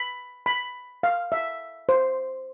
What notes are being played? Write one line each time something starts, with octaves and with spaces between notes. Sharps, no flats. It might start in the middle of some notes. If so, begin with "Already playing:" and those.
Already playing: B5
B5
F5
E5
C5